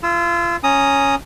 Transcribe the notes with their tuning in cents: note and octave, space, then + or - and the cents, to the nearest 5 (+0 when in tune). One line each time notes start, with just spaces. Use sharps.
F4 -30 E6 +0
C#4 +0 A#5 +0 D#6 +0